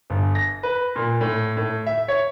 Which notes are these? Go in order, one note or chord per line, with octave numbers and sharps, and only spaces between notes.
G1
A#6
B4
A#2
A2
A2
E5
C#5